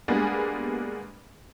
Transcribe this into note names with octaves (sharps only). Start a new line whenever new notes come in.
G3 G#3 A#3 B3 D4 G#4